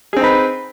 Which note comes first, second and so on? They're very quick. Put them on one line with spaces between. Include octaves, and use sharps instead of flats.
G#4 C4 D#4 B4